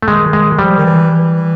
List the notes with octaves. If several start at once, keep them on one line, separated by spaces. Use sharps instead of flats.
A3
D#3 G#3
G#3
F3 G3
D#3
E3
E3